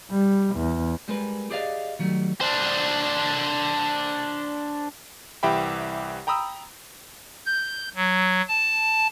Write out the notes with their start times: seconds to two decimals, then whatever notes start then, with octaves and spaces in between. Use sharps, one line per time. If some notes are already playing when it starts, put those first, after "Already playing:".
0.11 G3
0.56 E2
1.08 G3 G#3 A#4 B4
1.50 G4 G#4 D5 D#5 F5
1.99 D#3 F#3 G3 A3
2.41 D4 C5
5.43 C2 E3 G4 E5 G5 B5
6.27 G5 A#5 B5 D#6 E6
7.46 G6
7.95 F#3
8.48 A5